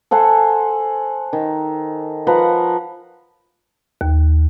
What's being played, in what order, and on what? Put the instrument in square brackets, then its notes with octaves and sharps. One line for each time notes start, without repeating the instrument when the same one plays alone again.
[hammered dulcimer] A4 C5 F#5 G#5
D#3
F3 B4 F#5 A#5
[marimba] D#2